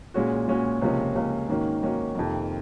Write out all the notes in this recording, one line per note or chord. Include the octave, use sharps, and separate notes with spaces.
A#2 G#3 C#4 F#4
A#2 G#3 C#4 F#4
C#2 C3 F3 A#3 C#4
C#2 C3 F3 A#3 C#4
G#2 D#3 A#3 C#4 F#4
G#2 D#3 A#3 C#4 F#4
F2 C3 D#3 A#3